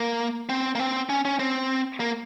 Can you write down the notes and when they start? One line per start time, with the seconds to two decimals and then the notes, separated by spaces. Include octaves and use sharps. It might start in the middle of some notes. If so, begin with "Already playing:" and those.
Already playing: A#3
0.49 C4
0.75 A#3
0.79 C4
1.09 C#4
1.25 C#4
1.39 C4
2.00 A#3